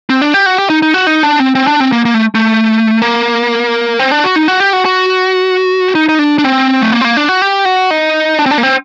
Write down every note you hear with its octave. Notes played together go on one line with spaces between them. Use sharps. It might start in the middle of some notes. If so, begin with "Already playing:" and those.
C4
D4
G4
F#4
G4
D#4
D#4
F#4
D#4
D4
C4
C4
D4
C4
A#3
A#3
A3
A3
A#3
C4
D4
F#4
D#4
F#4
G4
F#4
F#4
D#4
D#4
D4
D4
C4
A3
A#3
C4
A#3
D4
F#4
G4
F#4
D#4
D4
C4
D4
A#3
C4